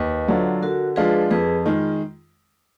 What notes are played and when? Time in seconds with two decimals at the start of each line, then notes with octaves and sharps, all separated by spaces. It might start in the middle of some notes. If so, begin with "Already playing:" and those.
Already playing: D#2 B4 D#5
0.28 D3 F#3 D4 F4
0.62 D3 F#4 A#4
0.96 F3 G#3 D4 F4 G#4 B4
1.31 F2 G#4 B4
1.66 D#3 G#3 F4